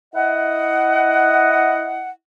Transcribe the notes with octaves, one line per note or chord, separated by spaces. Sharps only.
E4 D#5 F#5